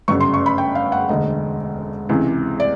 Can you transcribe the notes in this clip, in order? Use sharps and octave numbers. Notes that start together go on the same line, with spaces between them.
G1 F#2 C#3 C#6
C6
C#6
B5
G5
F5
F#5
E1 D2 D3 D#5
C#2 C3 E3
D5